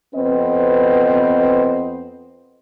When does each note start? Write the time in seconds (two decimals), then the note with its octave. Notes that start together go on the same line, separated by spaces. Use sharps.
0.14 F2 B3 C4 B4 D#5